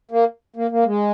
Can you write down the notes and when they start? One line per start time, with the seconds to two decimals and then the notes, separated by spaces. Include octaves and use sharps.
0.11 A#3
0.56 A#3
0.71 A#3
0.85 G#3